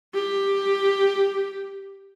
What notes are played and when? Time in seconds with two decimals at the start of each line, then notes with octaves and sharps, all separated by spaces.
0.14 G4